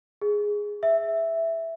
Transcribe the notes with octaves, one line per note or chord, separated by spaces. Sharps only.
G#4
E5